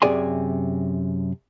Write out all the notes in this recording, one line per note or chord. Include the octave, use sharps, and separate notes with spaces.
F#2 C3 G#4 D5 G#5 C6